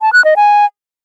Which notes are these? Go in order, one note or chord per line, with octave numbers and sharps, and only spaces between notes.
A5
F#6
D#5
G#5